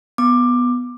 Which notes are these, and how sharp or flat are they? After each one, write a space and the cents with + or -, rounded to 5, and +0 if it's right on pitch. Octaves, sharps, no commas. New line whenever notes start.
B3 +0 D6 +15